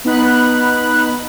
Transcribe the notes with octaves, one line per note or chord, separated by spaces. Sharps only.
B3 D#4 B5 F#6